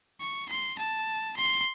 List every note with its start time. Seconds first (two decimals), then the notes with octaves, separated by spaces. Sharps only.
0.21 C#6
0.49 C6
0.78 A5
1.37 C6